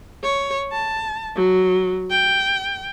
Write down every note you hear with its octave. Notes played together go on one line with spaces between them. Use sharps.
C#5
A5
F#3
G5